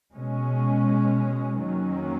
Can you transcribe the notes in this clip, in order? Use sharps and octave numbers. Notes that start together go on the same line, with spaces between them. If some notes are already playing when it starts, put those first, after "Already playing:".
B2 G#3 C#4
F2 D#3 F#3 A#3 C#4